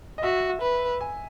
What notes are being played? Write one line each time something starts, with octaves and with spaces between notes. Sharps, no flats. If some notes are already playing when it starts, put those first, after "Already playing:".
D#5
F#4 E5
B4
G#5